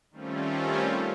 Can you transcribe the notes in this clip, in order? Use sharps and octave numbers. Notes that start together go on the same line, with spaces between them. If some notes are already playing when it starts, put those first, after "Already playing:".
D#3 G3 A3 C4 C#4 F4